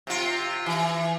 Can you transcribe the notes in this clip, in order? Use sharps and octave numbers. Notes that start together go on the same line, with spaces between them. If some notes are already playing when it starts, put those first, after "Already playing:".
C3 F4
E3